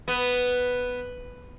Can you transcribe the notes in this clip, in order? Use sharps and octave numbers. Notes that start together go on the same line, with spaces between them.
B3